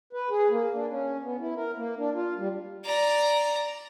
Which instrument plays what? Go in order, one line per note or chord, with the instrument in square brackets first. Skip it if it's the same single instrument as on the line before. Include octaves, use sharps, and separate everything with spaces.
[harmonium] B4
G#4
A#3
D4
C#4
B3
E4
A#4
A#3
D4
F4
G3
[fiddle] D5 A#5